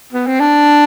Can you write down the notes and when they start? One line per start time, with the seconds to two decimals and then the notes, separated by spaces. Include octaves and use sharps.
0.13 B3
0.27 C4
0.40 D4